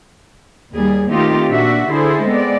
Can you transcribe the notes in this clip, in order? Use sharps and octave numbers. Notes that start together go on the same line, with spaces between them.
D#2 G3 G#4
D#3 A3 C4 D#4 F4 G4
A#2 D4 F#4 E5
D3 E4 G#4 A4 C5
G#3 B3 C4 D5